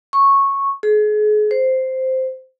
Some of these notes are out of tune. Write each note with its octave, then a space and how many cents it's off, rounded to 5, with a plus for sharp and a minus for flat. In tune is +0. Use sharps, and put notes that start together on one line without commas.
C#6 -10
G#4 +35
C5 -5